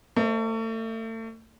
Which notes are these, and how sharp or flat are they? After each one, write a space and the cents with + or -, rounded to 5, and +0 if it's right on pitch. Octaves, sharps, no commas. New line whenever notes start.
A3 +35 C5 +0 D#5 +0